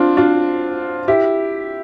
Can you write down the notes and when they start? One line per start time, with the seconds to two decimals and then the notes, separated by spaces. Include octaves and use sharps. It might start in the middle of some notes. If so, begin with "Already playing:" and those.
Already playing: C4 D4 F4
0.17 D4 F4
1.08 E4 G4